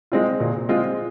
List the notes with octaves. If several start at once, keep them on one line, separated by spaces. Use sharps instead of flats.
G#3 C4 F4
A#2
G#3 C4 F4